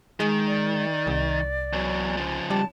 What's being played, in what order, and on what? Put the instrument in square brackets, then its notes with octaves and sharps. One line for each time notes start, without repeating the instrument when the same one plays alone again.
[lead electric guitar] D#3 [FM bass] G#3
[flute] D5
[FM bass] C2
[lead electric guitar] E2 F#3
C#3 F3
[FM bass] G3 [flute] A5